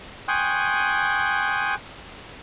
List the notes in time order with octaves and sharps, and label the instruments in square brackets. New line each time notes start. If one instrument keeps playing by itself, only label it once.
[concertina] G5 G#5 C6 C#6 D#6 F#6